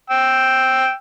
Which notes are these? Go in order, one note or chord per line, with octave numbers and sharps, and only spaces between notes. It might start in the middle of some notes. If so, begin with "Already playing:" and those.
G5 E6